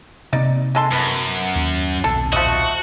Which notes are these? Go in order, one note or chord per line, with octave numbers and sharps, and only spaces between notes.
C3 A#3 C4 D#4 D5
G#3 A4 C6
F#2 B3
D#2
D#1 B1 C4 A4
F3 A3 F#4 D#5